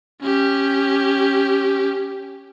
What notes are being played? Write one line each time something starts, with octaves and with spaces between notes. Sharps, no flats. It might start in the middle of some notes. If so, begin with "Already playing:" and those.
C#4 G4